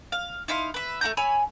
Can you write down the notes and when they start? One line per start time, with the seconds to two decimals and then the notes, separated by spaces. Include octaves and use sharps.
0.12 F5
0.48 D#4 E4 F5 C6
0.74 B4 E5
1.01 A3 F#4 A#5 G6
1.17 C#5 G#5 B5 E6